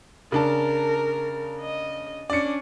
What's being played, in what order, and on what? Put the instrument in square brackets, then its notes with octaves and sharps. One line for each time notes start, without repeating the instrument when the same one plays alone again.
[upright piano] C#3 D4 A5 [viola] A#4
[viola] D#5
[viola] C#4 D4 [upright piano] D5 C#7